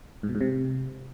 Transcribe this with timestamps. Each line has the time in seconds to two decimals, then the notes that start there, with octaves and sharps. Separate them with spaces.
0.23 G#2
0.29 B2
0.35 G#2
0.41 C3